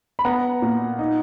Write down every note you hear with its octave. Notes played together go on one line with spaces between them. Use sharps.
B5
B3 F#5 A#5
A#2
D#4